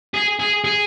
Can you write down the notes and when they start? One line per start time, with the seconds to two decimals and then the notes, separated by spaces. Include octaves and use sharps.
0.14 G#4
0.39 G#4
0.64 G#4